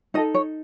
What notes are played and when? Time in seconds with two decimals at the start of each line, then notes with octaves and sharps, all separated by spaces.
0.14 D#4 A4 D#5
0.34 C#5